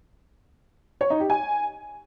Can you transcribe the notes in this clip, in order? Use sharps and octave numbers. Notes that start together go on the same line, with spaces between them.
C#5
D#4
G4
G#5